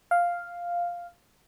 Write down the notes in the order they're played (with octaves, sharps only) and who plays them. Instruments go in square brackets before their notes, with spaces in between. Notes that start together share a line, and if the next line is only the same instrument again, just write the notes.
[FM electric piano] F5